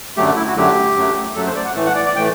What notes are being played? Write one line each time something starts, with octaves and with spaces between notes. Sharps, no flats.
F#2 D3 F#3 A3 G4
E4
F#4
F#2 D3 F#3 A3 G4
F#2 F#3 A3
F#2 F#3 A3 A4
C5
D5
F#5
A2 E3 A3
F#5
D5
D5
A2 E3 A3 G5